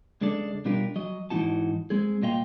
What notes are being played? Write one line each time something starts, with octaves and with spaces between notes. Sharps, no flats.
C#2 G#3 D4 A4 D5
B2 G3 D4 F4 G4 A#4
F#3 D#5
G#2 E3 C#4 D#4 F#4 A5
G#3 C4 G#4
C2 A#2 D#5 F5 G5 C6